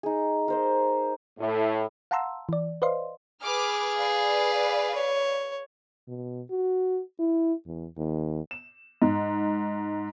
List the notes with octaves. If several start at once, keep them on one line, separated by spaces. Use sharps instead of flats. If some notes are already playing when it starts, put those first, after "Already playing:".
D#4 G#4
A#4 C5 D#5
A2
F5 F#5 A5 A#5 C6 E6
E3 D5
B4 C5 D5 D#5 F5 C6
G#4 B4 D6 F6
B4 D5 F5
C#5
B2
F#4
E4
E2
D#2
E7
G#2